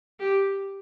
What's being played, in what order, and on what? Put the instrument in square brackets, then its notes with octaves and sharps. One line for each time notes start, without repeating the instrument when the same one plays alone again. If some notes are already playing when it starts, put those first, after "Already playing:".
[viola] G4